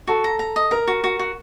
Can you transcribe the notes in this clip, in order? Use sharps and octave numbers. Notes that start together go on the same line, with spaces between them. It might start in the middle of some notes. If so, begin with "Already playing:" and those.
F#4 A4
A#5
A#5
D#5
A#4 A#5
F#4
F#4
F#4